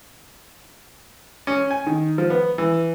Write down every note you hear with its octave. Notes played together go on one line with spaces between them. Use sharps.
C#4
G#5
D#3
F3
B3
E3